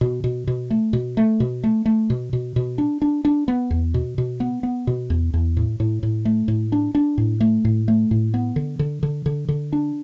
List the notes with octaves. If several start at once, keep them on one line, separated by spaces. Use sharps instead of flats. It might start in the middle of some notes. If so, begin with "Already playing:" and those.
B2
B2
B2
A3
B2
A3
B2
A3
A3
B2
B2
B2
D4
D4
D4
B3
E2
B2
B2
B3
B3
B2
E2
E2
A2
A2
A2
A3
A2
D4
D4
A2
A3
A2
A3
A2
B3
D3
D3
D3
D3
D3
D4